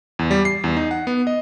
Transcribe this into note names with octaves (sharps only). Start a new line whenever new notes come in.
E2
G3
C7
E2
D#4
F#5
B3
D#5